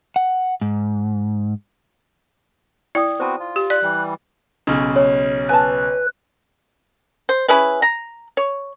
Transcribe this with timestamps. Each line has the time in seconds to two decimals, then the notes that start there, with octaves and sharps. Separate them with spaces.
0.16 F#5
0.61 G#2
2.95 E4 D5 G5 D#6
3.20 B3 C4 F#4 C5 A5
3.40 F4
3.56 G4
3.70 D5 F#6
3.83 E3 G3
4.67 B1 C#3
4.96 C#5
5.49 B4 G#5 A5
7.29 C5
7.48 C#4 E4 G#4 B4
7.82 A#5
8.37 C#5